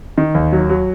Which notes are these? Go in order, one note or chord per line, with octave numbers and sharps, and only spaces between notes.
D#3
D#2
F#3
F#3